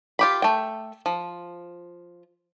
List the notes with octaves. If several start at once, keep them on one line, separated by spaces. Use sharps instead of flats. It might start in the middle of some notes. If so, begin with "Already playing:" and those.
F4 G4 B5
A3 G5
F3